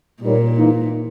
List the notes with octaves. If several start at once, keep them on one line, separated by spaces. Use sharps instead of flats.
A#2 G3 A#3 D#4 A#4 C#5
G#2 E3 A#3 D#4